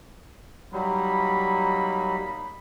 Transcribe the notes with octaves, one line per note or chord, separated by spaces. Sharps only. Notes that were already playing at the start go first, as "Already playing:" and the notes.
F#3 G3 A#3 D#4 B5